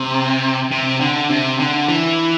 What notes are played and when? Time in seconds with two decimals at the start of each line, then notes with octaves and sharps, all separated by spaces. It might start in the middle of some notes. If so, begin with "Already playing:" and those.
Already playing: C3
0.71 C3
1.00 D3
1.30 C3
1.59 D3
1.88 E3